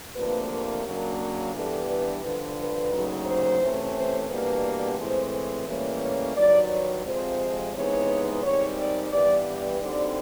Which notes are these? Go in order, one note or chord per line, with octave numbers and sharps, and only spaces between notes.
D2 C3 F3 A#3 D4 B4
A#4
C#3 F#3 A#3 D4
G2 E3 G3 B3 D4 A4
B4
G2 D3 F3
B4
D2 C#3 F#3 A#3 D#4
C5
C3 E3 A3 C#4
C5
E2 B2 G3 A#3 D4 B4
A2 E3 G#3 C4 C5
A2 E3 G3 A#3 C#4 C#5
C#5
G2 D#3 F#3 D5
C#5
F2 C3 F3 G#3 C5
C3 E3 G#3 B3 D#4 C#5
G#2 D#3 G3 C4 C#5
D5
G2 E3 G3 B3 D5
D5
D2 D3 G3 C4 D#4 D5